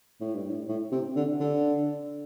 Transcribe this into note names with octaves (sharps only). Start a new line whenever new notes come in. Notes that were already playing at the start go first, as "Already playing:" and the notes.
A2
G2
A2
A2
C3
D3
D3